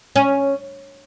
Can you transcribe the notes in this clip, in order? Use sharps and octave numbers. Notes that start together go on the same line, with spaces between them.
C#4